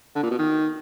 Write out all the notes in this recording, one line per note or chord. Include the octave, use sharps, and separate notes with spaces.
D3
A#2
B2
D#3